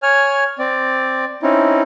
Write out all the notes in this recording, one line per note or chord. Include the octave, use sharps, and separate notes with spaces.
C#5 G#5 F6
C4 D5
C4 C#4 D#4 E4